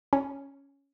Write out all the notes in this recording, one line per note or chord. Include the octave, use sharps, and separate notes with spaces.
C#4